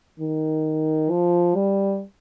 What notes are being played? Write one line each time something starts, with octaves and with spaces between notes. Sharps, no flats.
D#3
F3
G3